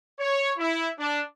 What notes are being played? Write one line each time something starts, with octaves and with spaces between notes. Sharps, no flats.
C#5
E4
D4